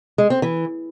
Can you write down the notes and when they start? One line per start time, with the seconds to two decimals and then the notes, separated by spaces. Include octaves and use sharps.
0.18 G#3
0.30 C4
0.42 E3